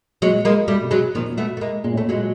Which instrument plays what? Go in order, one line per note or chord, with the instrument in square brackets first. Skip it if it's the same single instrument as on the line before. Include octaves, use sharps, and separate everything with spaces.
[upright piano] A#2 [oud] F#3 G#3
[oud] G#3 A#3
[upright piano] B2 [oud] G3 A3
[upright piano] B2
C3
[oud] F#3 G#3
[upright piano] B2
[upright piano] A#2 [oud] D#3 F3
[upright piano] A#2
[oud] A3 B3
[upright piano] B2
[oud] A3
G#3 A#3
[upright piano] A#2 [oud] G#3
[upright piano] A2 [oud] A3
[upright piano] A#2
[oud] F#3 G#3